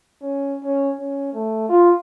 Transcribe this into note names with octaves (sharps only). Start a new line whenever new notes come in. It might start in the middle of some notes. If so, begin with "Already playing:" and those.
C#4
C#4
C#4
A3
F4